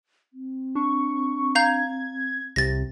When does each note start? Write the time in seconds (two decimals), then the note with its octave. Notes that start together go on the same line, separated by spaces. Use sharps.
0.33 C4
0.75 D4 C#6
1.55 F5 A#5 G6 G#6
2.56 C2 C3 A6 A#6